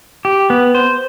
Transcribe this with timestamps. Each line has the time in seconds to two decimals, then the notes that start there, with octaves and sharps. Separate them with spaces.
0.25 G4
0.50 B3
0.75 C5